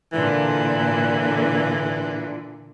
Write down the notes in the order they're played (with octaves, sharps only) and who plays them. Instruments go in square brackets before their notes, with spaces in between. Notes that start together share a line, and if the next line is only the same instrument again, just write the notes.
[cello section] A#2 D3 [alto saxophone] E3